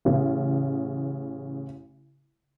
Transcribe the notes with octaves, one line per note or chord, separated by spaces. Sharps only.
A1 C#3